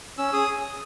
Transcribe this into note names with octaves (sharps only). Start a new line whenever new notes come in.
C#4 E6
G#4 D#6